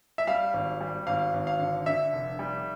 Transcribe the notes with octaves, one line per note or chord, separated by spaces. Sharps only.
E5
G3 F5
G#1
G3
G#1 F5
G#1
F5
D3
D3 E5
F1
G3